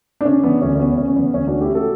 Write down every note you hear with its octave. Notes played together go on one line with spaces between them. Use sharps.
D4
C#3 C#4
E3 B3 D4
D2 C#4
C#4
A3 B3
C#3 C#4
C#4
E3 B3
D2 C#4
A3 D4 F#4
E4 G4
C#3 F#4 A4